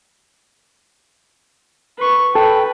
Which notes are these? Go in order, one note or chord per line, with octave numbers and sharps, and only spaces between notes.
B4 C#6
A4 B4 G5